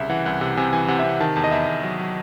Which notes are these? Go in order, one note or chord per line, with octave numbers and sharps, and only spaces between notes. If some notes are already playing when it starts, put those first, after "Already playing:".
Already playing: C2 C#3 E5
E3 F#5
C2 F#5
C3 F#5
C3 G#5
E3 G#5
C3 F#5
E5
C3
F#5
D#3 A5
E2 A5
D#5
E2 E5
E2
F#3
F#3